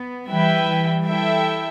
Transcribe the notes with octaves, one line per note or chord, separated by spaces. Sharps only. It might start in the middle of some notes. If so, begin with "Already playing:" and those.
Already playing: B3
E3 G3 E4 B4 E5 G5
E3 G3
E4 A4 E5 G5